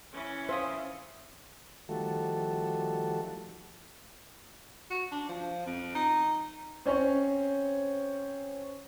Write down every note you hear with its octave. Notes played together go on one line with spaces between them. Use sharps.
E3 C#4
C5 E5 F5 D#6
D#3 F3 G3 A3 F#4 A4
F#4
D4
F3
F2
D#4
C4 C#4 C5 C#5